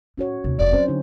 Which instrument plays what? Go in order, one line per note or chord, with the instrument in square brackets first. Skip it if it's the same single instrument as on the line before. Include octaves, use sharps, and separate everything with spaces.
[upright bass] A2 [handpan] C#4 F#4 C#5
[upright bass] D#2 C3
[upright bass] F1 F#2 [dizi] D5
[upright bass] F#3 [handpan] C4 C#4 C5
[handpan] D3 D#4